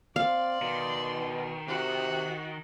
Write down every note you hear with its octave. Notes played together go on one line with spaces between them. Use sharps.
C4 D5 F5 C6
B2 D#3
C3 F#4